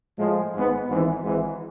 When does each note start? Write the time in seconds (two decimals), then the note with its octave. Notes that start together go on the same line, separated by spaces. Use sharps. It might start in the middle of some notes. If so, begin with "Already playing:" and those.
0.18 A2 F3 G#3
0.54 G#1 G#2 G#3 B3
0.89 G#1 G#2 E3
1.24 G#1 G#2 E3